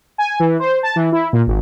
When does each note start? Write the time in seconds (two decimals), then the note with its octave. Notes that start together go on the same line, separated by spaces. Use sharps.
0.18 G#5
0.40 E3
0.60 C5
0.83 A5
0.96 E3
1.12 E4
1.33 A#2
1.47 G#1